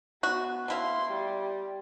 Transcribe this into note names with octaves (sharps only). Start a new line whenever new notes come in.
B3 F#4
B2 E4 F5 C6
G3